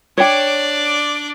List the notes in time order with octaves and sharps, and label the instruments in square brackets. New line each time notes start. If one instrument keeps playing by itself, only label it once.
[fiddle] D4 D5 [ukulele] C#5 G5